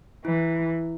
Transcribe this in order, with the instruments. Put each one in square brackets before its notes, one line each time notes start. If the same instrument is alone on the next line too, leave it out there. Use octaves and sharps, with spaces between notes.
[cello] E3 [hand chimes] E4